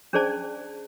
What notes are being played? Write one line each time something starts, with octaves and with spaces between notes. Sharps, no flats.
C#4 D4 G#4 C5 D5 A5